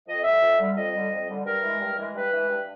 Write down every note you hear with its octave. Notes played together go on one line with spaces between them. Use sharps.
F2 D#5
D3 G3 E5
F2
D3 G3
F2 D#5
D3 G3
F2
D3 G3
G2 A#4
E3 G#3
G2
E3 G#3
G2 B4
E3 G#3
G2